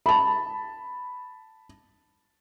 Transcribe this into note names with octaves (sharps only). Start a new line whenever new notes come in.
A5 B5